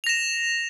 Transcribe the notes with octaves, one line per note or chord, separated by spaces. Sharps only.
A#6 E7 F7